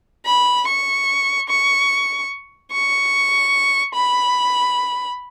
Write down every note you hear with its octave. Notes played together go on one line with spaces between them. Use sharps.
B5
C#6
C#6
C#6
B5